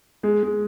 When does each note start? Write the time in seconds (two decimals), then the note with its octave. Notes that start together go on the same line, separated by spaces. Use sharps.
0.23 G#3
0.43 G#3